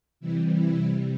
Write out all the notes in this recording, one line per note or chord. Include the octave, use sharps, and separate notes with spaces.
C3 E3 G3 E4
E4
C3 G3